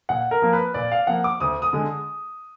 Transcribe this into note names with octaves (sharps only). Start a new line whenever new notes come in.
A#2 F#5
A#4
F3 A#3
B4
A#2 D5
F5
F3 A#3 F#5
D6
D2 D#6
D#6
D3 G#3